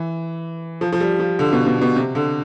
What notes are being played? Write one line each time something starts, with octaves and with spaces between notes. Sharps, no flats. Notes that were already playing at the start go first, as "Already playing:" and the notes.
Already playing: E3
F3
F3
G3
F3
D3
B2
B2
B2
C3
D3